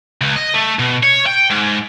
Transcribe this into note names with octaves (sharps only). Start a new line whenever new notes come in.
C#2
D#5
A3
B2
C#5
G5
G#2